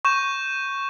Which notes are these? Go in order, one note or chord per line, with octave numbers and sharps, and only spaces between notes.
C#6 G6 E7